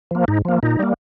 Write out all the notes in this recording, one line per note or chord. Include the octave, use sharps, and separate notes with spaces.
F3 A#3
G#2 D#4
F3 A#3
A#2 D#4
G3 A#3